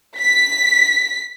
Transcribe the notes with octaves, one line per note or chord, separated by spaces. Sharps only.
B6